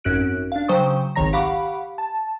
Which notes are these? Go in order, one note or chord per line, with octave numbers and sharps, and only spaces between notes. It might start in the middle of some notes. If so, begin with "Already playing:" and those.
G#1 F#2 C#4 F#4 F#6 D7
D4 F5
C#3 F#3 C5 G5 C#6 D#6
G#1 C#2 D#3 C#5 A#5 A#6
G4 F5 F#5 B5 C#6 D6
A5